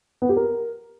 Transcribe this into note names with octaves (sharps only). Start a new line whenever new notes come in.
B3
G4
A#4